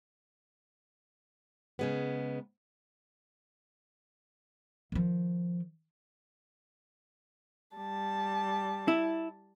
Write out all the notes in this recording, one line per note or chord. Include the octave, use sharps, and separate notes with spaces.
C#3 G#3 B3
D#3 F3
G3 A5
E4